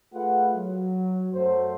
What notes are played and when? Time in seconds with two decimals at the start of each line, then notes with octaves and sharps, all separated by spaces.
0.14 A3 F4 G#4 B4 F#5
0.55 F#3
1.33 F#2 F#3 A3 C5